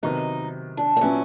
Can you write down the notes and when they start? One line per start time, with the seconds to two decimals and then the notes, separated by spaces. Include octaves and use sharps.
0.03 C3 D#3 F#3 B3 D#4
0.77 D4
0.96 C4
1.01 A#2 F#3 B3 C#4 E4